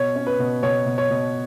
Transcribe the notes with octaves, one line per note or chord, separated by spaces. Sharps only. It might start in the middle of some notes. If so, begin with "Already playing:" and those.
Already playing: B2 C#5
C#4
B4
B2
B2 C#5
B2
C#5
B2